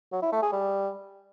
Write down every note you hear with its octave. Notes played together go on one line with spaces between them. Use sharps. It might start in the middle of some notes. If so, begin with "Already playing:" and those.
F#3
E4
A3
G#4
G3